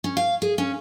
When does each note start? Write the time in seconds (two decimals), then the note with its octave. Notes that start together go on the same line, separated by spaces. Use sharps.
0.04 C#4
0.17 F5
0.42 G#4
0.58 C#4